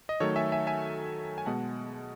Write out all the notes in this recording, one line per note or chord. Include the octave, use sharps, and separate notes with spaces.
D#5
D#3 F#3 A3 A4 C#5
E5 G#5
E5 G#5
E5 G#5
G#5
B2 G#3 B3 F#5 A5